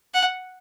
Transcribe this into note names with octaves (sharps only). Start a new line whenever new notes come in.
F#5